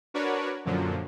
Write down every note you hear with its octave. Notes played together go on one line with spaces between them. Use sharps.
D4 F#4 A#4 B4 C#5 D5
F#2 A#2 D3 F3 F#3